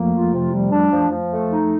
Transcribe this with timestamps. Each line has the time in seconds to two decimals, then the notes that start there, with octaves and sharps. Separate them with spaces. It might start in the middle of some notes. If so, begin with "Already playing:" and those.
Already playing: F2 F3 A3 A#3
0.13 F4
0.32 C3
0.52 G3
0.71 D4
0.91 F3
1.10 F3
1.31 A3
1.50 D#4